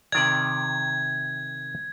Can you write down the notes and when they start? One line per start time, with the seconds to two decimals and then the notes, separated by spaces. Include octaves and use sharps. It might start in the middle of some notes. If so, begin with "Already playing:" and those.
0.12 C3 D#3 D5 G#6